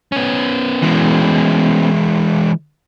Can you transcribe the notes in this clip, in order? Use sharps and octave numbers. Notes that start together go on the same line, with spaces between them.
B3 C#4
E3 G#3